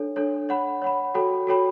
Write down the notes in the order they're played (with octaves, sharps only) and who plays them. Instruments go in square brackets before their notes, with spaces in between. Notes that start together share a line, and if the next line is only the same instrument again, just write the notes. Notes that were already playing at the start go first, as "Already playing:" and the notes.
Already playing: [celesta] D4 A4 C#5
D4 A4 C#5
C#5 F#5 B5
C#5 F#5 B5
F#4 A4 C#5 G5 B5
F#4 A4 C#5 G5 B5